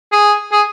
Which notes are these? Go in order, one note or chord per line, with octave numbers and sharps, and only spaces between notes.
G#4
G#4